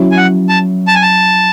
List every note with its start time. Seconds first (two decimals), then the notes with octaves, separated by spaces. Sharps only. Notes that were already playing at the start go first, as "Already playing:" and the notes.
Already playing: F#3 C#4 E4
0.12 G#5
0.17 F#5
0.49 A5
0.88 A5
0.95 G#5
1.02 A5